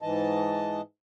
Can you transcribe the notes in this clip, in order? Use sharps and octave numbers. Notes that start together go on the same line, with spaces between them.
G#2 E3 D#5 A5